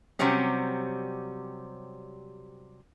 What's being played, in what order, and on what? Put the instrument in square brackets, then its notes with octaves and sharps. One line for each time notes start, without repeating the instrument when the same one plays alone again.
[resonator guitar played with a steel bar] C3 F#3 G3 C4 C#4